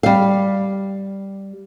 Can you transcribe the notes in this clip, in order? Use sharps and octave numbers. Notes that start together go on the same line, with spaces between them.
G3 F5